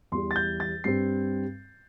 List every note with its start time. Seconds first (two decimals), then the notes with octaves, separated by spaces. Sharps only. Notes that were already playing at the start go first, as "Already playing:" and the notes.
0.12 E2 E3 G3 C6
0.31 A6
0.36 G6
0.60 A6
0.84 G2 G3 C4 C7